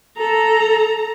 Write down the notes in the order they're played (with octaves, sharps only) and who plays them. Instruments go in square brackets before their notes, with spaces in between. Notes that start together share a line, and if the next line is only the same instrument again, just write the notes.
[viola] A4 A#5